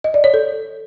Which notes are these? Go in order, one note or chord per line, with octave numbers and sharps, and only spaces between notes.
D#5
D5
C#5
A4